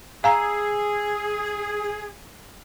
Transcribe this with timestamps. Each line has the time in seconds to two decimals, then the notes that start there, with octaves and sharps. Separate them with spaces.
0.24 G#4 F5 G#5 A#5 E6 C7